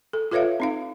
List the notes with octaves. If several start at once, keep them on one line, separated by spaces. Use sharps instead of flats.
A4
F4 A4 B4 C#5 E5 F5
C4 D#4 F5